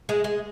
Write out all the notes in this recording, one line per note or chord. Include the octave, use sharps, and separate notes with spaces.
G#3
G#3